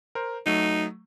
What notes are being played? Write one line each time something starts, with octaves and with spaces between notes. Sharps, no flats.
A#4 C5
F#3 A3 D#4